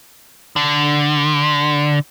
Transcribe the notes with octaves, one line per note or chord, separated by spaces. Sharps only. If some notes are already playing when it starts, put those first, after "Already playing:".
D3